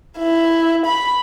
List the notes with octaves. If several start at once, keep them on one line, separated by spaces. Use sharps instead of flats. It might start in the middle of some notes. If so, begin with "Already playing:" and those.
E4
B5